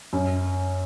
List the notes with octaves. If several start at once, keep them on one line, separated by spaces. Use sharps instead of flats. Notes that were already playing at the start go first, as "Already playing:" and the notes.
F#2